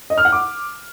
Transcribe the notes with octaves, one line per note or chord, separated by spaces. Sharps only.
D#5
F6
F#5
D6